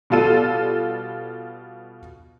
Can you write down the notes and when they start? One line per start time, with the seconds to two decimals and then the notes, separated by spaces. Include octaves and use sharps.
0.10 B2 G3 F4 A4 D#7